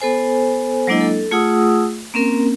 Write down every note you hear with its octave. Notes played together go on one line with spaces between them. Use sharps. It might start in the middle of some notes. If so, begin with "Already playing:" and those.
B3 A4 C5 G#5
F#3 G#3 A#3 D4 E4 D#5
A4
A3 F4 G#4 F#5 D#6 E6
A#3 C4 C#4 A#4